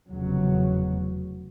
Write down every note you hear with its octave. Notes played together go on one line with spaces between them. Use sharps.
F1 E2 C#3 F#3